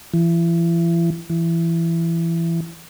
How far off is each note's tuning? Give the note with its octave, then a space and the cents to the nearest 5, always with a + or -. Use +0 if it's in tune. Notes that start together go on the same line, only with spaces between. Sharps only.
E3 +35
E3 +20